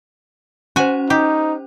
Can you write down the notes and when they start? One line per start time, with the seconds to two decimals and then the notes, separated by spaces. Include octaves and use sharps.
0.76 C#4 F#4 C5 G#5
1.10 D#4 G4